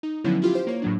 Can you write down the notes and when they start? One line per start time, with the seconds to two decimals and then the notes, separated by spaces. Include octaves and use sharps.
0.03 D#4
0.24 D3 F3 F#3 B3 C#4 E4
0.42 E4 F4 G4
0.54 G4 C5
0.67 A#3 C#5
0.82 A2 F#3 D4